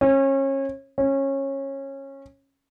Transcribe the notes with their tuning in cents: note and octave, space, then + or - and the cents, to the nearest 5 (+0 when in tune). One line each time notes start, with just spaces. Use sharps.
C#4 -30
C#4 -20